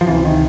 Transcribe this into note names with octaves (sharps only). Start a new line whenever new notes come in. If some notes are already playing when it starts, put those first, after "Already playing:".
F3
C#2 C3 E3
D#3